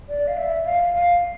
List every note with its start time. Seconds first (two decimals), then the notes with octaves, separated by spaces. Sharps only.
0.09 D5
0.28 F5
0.37 E5
0.65 F5
0.94 F5